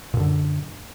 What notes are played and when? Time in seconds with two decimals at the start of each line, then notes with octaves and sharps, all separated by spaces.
0.14 A#2
0.17 F#2
0.20 D3